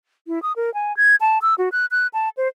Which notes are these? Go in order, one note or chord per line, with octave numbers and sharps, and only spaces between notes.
E4
D#6
A#4
G#5
G#6
A5
E6
F#4
F#6
F#6
A5
C5